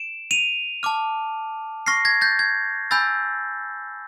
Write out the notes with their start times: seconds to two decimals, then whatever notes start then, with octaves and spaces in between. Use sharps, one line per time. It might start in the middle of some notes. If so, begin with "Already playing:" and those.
Already playing: D7 E7
0.31 D#7 F7
0.83 A5 D6 F6
1.87 C#6 F6 A#6 C7
2.05 G#6 A#6
2.21 G6 A6
2.39 G#6
2.91 G#5 B5 E6 G6 A6